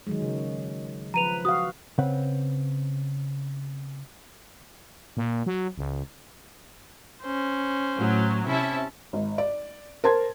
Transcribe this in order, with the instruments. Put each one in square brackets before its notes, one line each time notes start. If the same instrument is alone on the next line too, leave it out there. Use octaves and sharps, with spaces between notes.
[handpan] D#3 F#3 G#3
C#3
[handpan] F3 B4 [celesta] A#5 D#7 F7
[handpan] F#4 F5 [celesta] D#6
[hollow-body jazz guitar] C#3 C4 B4 F#5
[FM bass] A#2
F#3
C#2
[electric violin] C#4 C5
[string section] A2 F#3
[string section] C3 E4 E5 [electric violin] C#4 A5
[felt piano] G#1
D5
A#4 C5 A5 C6 G#6